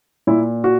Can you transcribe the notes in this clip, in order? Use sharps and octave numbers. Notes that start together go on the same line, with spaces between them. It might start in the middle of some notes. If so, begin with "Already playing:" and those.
A#2 E4
F#4